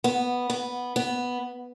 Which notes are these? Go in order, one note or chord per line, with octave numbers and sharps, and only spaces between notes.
B3
B3
B3